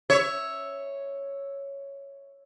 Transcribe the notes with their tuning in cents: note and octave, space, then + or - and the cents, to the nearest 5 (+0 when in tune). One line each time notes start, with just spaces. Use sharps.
C#5 +0 E5 +0